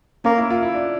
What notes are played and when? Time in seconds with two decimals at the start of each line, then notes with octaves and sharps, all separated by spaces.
0.25 A#3 C#4
0.38 E4
0.50 F4
0.63 E4
0.74 D4